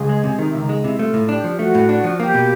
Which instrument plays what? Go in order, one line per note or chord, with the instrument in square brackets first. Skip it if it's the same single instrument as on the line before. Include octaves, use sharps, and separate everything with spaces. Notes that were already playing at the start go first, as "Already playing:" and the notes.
Already playing: [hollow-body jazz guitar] C#2 [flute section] G#4
[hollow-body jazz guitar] G#3
C3
[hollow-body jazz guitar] D#3 [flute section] D#4
[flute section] E4
[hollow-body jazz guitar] C#2 [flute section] D#4
[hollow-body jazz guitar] G#3
[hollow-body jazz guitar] C3 [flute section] E4
[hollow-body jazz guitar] A3 [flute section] F4
[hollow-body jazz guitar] A2
[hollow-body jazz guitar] D4 [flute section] G4
[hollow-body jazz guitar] F3
[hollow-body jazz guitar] A3 [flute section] F#4
[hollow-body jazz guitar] A2
D4
F3
[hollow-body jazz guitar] A#3 [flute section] G4
[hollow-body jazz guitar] B2